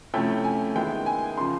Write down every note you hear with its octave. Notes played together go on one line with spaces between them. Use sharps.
C3 F3 A3 C#4 E4 G5
G#5
D#3 G#3 B3 E4 G5
G#5
C#3 F3 C6